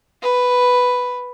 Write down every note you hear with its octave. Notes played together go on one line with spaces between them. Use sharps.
B4